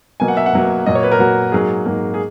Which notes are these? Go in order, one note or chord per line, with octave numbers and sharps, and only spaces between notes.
B2 F#3 A#3 G#5
F#5
E5
F#5
B2 F#3 A#3
A#2 F#3 A#3 D#5
C#5
B4
A#4
A#2 F#3 A#3 F#4
G#2 F#3 A#3 G#4
G#2 F#3 A#3
G#4